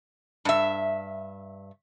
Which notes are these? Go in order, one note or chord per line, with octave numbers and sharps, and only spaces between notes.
G2 E5